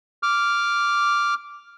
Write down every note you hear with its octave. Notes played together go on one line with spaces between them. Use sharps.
D6 F6